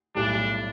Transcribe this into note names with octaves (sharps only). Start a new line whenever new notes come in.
B1 A2 G3 D4